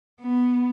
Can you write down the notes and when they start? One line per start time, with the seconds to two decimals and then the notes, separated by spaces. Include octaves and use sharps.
0.21 B3